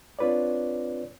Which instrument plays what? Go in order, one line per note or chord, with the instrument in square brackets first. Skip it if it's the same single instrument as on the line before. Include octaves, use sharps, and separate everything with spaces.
[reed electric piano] C4 D4 F4 B4 C#5 D5